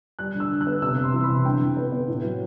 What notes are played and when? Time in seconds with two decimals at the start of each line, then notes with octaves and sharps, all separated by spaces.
0.19 G3 F#6
0.35 D3
0.40 E6
0.50 D3
0.61 F#6
0.67 B3
0.82 C3 E6
0.97 C3
1.04 C6
1.14 E3
1.24 B5
1.29 C3
1.45 D3 G5
1.61 D3
1.77 B3
1.92 B3
2.08 A2
2.24 F#3